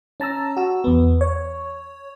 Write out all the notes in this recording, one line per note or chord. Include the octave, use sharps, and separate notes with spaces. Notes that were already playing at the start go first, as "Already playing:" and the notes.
C#4 A5 A#5 E6
F#4 E6
E2 B3
C#5